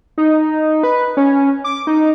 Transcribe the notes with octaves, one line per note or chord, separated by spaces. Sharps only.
D#4
B4
C#4
D6
D#4